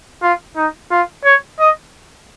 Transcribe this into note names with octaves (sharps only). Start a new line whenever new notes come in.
F4
D#4
F4
C#5
D#5